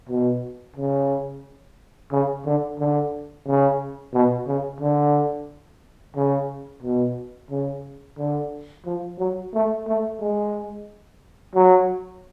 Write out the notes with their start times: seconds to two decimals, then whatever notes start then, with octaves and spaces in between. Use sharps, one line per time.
0.09 B2
0.76 C#3
2.12 C#3
2.45 D3
2.79 D3
3.47 C#3
4.13 B2
4.47 C#3
4.81 D3
6.16 C#3
6.83 B2
7.51 C#3
8.18 D3
8.85 F3
9.19 F#3
9.53 A3
9.87 A3
10.20 G#3
11.55 F#3